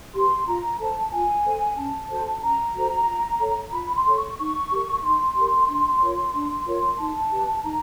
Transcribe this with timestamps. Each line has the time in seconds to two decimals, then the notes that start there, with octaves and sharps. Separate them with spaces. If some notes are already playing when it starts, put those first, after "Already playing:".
0.14 G4 B4 C6
0.47 F4 A#5
0.79 A4 C5 A5
1.12 F4 G#5
1.45 A4 C5
1.77 C#4 A5
2.10 F#4 A4 C5
2.42 C#4 A#5
2.74 F#4 A4 C5
3.07 F4
3.40 A4 C#5
3.72 F4 B5
3.94 C6
4.06 A4 C#5
4.16 C#6
4.38 D#4 C#6
4.71 G4 A#4
5.03 D#4 C6
5.35 G4 A#4
5.68 D4
6.00 F4 A#4 C#5
6.33 D4
6.66 F4 A#4 C#5
6.99 D#4 A5
7.31 G4 B4
7.63 D#4 A#5